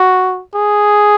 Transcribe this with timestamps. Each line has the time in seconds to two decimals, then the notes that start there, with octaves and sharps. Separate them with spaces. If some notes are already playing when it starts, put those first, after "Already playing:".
Already playing: F#4
0.55 G#4